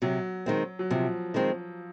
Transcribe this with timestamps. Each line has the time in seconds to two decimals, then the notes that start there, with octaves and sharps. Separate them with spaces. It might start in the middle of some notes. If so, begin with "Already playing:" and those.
0.02 C3 F#3
0.46 D#3 G#3 C4
0.79 F#3
0.90 C3 F3
1.34 D#3 G#3 C4